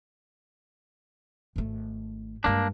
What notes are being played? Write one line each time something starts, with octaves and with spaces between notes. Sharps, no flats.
G#1 A3
G2 G#3 A#3 D4